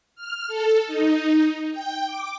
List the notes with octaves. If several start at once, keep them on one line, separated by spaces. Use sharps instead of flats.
F6
A4
D#4
G5
D6